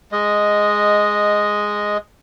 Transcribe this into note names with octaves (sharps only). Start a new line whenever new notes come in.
G#3 D#5